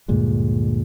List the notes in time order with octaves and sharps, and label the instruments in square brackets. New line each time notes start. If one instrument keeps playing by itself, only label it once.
[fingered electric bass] D2 G2 A#2 G#3